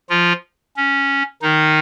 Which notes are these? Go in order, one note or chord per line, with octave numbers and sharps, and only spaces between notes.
F3 F4
C#4
D#3 D#4